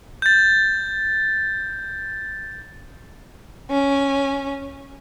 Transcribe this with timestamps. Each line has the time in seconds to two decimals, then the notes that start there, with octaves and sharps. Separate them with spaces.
0.22 G6 A6
3.71 C#4